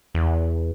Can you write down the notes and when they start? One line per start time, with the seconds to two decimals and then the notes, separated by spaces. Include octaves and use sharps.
0.15 E2